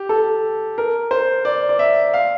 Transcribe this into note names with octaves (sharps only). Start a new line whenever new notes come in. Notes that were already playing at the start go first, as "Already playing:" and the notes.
Already playing: G4
A4
A#4
C5
D5
D5
E5
F5